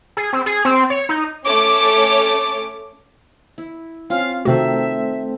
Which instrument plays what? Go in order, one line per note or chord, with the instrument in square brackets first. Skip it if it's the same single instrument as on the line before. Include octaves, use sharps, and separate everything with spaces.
[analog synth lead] G#4
C4
G#4
C4
C#5
D#4
[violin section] A3 C#4 C#5 D6
[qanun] E4
[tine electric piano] C4 C#4 [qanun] F4 [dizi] F5
[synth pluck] C3 F#4 [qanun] D#3 [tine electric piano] A3 C4 A4 [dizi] E5